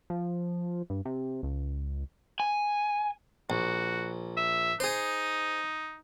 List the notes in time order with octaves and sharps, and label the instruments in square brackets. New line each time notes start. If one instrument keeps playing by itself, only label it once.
[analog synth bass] F3
G2
C3
C#2
[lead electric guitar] G#5
[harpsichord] A#1 [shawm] F#4
[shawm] E5
[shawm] D#4 [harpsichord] G#4 C5